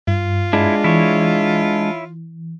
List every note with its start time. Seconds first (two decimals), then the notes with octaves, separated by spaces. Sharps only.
0.07 G2 F4
0.53 G#3 D4 E4
0.84 E3 E4 C#5